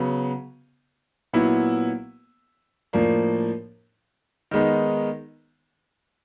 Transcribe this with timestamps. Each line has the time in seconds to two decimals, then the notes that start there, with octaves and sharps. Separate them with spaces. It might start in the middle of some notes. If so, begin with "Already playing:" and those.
Already playing: C#3 F#3 B3
1.33 A#2 F#3 B3 E4
2.93 A2 F3 A#3 D4
4.51 D#3 G#3 B3 D#4